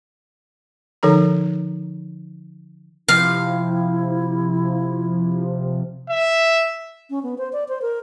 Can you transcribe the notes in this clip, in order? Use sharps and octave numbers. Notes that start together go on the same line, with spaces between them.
D3 F3 D#4 A4 A#5
C3 F3 E4 F5
E5
C#4
B3
C5
D5
C5
A#4